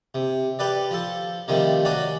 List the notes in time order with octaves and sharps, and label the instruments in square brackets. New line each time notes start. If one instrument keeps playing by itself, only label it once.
[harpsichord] C3
G4 A4 B4 D5
F3 A4
C3 D#3 F3 G3 A3
F#3 C#4 F#4 D5